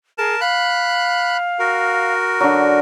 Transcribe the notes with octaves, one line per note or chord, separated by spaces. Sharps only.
G#4 A#4 A5
F5 B5 F#6
F#4 A#4
D3 F#3